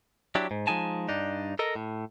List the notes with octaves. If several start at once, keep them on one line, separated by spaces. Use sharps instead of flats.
F#3 D4 E4 G4
G#2
F3 G#3 D#4 G#5 A5
G2 D4 D#4
A4 A#4 D#5
A2